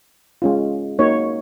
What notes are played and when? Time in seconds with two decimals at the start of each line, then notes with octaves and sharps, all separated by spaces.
0.42 G#3 C#4 F4
0.99 A#3 D#4 F#4 C#5